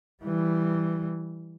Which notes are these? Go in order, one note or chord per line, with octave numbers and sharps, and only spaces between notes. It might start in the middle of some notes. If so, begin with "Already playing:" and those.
E3 G3